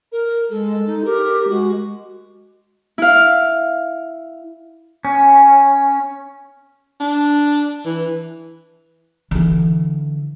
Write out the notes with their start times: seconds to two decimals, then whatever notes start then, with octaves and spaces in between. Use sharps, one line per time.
0.12 A#4
0.50 G#3 A4
0.86 D#4
1.05 G4 A#4
1.49 G#3 F#4
2.98 E4 F5
5.05 C#4
7.00 D4
7.86 E3
9.31 D3 E3